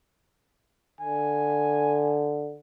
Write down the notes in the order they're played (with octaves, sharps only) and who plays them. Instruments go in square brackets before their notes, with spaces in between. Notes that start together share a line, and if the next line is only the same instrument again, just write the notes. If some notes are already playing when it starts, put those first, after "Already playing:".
[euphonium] D3 [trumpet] G#5